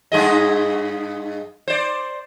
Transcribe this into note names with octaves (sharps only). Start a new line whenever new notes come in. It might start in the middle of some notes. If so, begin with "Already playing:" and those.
G2 G#4 D#5
C5 D5